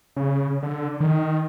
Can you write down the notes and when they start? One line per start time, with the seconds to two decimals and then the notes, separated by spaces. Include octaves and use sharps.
0.16 C#3
0.63 D3
1.00 D#3